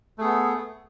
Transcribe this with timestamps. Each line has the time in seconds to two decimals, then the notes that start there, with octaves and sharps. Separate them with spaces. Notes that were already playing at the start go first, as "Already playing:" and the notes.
0.18 A3
0.21 G#4
0.24 B3